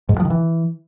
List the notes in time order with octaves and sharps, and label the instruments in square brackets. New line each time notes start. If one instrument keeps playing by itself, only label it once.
[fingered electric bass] G#2
G2
F3
D#3
E3